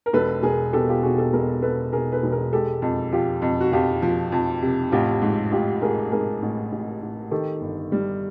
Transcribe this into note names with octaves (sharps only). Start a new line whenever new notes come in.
A#4
E1 A4 B4
E1 G#4 A#4
B2 G4 A4
F4 G4
B2 F#4 G#4
G4 A4
E1 G#4 A#4
B2 A4 B4
B2 G#4 A#4
A4 B4
E1
G#4 A#4
G#3 G4 A4
F2
F3 F4 G4
F2
F#4
F2 F4 G4
F3
F2
C3
A1 F4 G4
G#2
A1 F4 G4
A1 G#4 A#4
G#2 G#4 A#4
A1
A1
A1
D#3 G4 A4
G1
G3